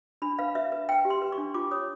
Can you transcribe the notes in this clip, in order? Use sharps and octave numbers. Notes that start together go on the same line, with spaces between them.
D4 B5
B4 F5
B4 E5
B4
B4 G5
G4
C6
B4
C#6
D4
F4 D6
C#5 D#6